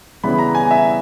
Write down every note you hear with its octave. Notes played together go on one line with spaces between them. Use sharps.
C#3 E3 G3 B3 E4 B5
A#5
G#5
E5